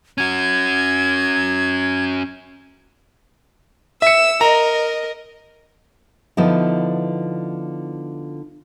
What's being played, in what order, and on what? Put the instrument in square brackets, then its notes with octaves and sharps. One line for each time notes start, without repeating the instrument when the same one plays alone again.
[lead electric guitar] C#4 F#4 [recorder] G#6
[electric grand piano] E5 C#7 [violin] E6
[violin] A#4 D#5 [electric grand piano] A#5
[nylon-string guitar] D3 F3 B3 D#4 E4